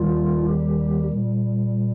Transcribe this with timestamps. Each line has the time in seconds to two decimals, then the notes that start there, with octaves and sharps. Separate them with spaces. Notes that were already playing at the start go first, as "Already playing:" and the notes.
Already playing: D#2 D#3 G3 F4
0.48 G4
1.10 A#2 G3